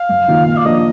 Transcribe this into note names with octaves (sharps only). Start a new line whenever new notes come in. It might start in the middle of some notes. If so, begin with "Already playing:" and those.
Already playing: F5
F#2
D#3 A#3 F4
A#2 F5
D5
F3 A#3 D4 D#5